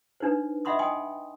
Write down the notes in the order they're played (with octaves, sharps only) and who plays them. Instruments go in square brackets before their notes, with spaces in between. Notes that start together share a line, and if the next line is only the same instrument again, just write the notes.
[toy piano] D4 D#4 B4 C5
D#5 E5 F#5 B5 C6 D#6
D#5 G5 G#5 C6 D#6